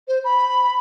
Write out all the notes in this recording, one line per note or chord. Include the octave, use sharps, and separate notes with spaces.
C5
B5